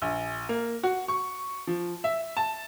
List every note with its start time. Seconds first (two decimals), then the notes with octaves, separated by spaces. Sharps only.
0.02 A#1
0.49 A#3
0.83 F#4
1.08 C#6
1.67 F3
2.04 E5
2.37 A5